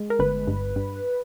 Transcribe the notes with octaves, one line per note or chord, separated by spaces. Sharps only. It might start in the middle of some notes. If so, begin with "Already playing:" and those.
Already playing: G#3
A#4
G1 B4
G2
G2